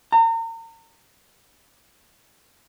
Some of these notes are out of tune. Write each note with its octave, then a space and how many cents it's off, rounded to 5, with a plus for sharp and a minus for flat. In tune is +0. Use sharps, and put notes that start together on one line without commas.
A#5 -35